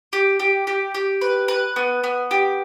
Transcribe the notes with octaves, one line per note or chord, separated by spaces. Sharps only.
G4
G4
G4
G4
B4
B4
B3
B3
G4